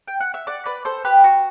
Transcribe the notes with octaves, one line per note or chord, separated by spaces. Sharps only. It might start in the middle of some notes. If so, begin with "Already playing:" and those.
G5
F#5
E5
D5 F#5
B4 D5
A4 C5
G4 B4
F#4